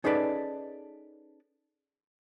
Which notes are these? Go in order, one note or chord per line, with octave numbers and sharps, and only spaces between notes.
C#4 D#4 G#4 A4 B4 D5